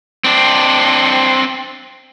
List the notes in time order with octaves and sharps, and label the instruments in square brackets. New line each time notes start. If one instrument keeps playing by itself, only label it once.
[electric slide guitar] C4 D4